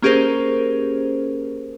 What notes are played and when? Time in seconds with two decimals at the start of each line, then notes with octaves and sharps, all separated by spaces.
0.02 A#3 C#4 G4 G#4 A#4 C5